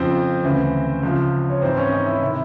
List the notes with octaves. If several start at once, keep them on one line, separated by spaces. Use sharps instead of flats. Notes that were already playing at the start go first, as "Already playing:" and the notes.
Already playing: F2 C#3 F3 C4 C5
D2 C#3 E3
C#2 C#3 F3
C#5
G#2 E3 C4 C5
C#4 C#5
D#4 D#5
E4 E5
C3 D#3